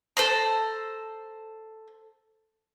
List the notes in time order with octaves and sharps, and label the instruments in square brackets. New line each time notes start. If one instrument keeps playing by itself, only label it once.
[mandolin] A4 C5 A#5